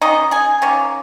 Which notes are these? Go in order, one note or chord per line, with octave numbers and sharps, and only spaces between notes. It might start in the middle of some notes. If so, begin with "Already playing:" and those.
D#3 C#4 D#4 D#5
G#4 G#5
D#3 A#3 C#4